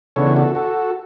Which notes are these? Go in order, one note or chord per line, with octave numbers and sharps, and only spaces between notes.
C#3 E3 B3 D4 A4 C#5
F#4 A4
F#4 A4